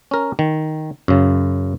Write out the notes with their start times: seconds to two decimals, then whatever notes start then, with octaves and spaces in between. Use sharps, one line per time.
0.11 C#4 A#4
0.39 D#3
1.08 F#2 C#3